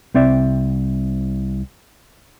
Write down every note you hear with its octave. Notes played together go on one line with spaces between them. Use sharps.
C2 C4 D5 E5